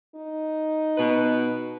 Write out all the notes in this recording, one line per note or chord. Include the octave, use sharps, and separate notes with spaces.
D#4
B2 B4